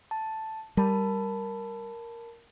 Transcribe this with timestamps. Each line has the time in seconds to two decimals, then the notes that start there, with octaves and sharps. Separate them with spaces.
0.11 A5
0.77 G3 A#4 A5 B5